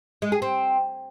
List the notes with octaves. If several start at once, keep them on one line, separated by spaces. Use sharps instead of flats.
G#3
G#4
C4